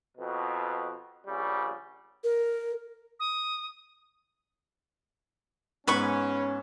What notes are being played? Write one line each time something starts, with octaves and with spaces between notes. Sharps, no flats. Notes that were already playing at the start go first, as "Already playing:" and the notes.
F2 B2
A#1 C#3 G3
A#4
D#6
G#2 B3 C#4 B4 B5 C#6